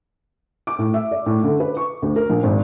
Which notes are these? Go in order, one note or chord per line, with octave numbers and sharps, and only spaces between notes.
D6
A2
E5
D5
A2
D3
B4
C#6
D2
A#4
A#1
G#1